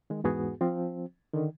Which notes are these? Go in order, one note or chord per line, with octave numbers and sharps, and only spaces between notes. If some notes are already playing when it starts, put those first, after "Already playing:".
D#3 G#3
E2 G#2 B3 F#4 G#4
F3 C4
D3 D#3